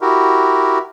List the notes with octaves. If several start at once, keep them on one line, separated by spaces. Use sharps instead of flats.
E4 F#4 G4 A#4